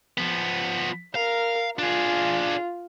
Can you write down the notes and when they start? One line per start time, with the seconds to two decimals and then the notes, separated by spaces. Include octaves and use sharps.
0.18 F3 B3
1.15 A#4 F5
1.79 D4 F4 G#4